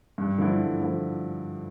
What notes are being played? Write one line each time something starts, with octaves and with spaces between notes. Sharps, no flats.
G2
D3 F3 A3 E4
G2
D3 F3 A3 E4